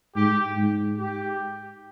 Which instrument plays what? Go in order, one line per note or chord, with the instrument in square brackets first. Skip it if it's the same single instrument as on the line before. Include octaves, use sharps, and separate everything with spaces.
[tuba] G#2 [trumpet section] G4
[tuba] G#2
[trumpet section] G4